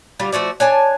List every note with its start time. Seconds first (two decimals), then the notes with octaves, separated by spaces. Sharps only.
0.19 D3 G3 F4
0.32 F3 A3 F#4 D5
0.60 D4 C#5 G#5 A5